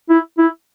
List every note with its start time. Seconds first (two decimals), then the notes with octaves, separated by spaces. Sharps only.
0.09 E4
0.38 E4